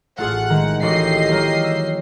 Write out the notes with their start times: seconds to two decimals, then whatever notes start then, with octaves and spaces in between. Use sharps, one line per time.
0.18 A1 A3 F4 G#4 F#5
0.50 D#3 G#3
0.82 A1 F#4 G4 D#5 C7
1.28 F#3 G#3 A#3
1.64 E6